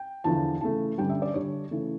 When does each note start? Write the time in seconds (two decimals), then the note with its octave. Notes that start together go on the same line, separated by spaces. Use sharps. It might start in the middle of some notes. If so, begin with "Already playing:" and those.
Already playing: G5
0.24 E2 D3 F3 A5
0.61 C#3 E3 A3 A5
0.98 G2 D3 G3 C#4 G5
1.09 E5
1.22 D5
1.34 D3 G3 D4 C#5
1.71 C#3 E3 A3